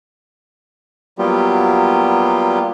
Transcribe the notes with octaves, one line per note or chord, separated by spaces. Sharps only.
F#3 G3 A#3 B3 F4 G4